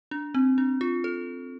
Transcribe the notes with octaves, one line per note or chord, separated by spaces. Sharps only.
D4
C4
D4
F4
A4